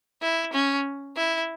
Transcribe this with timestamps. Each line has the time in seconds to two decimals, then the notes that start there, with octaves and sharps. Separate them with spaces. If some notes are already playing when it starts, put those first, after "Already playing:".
0.22 E4
0.53 C#4
1.17 E4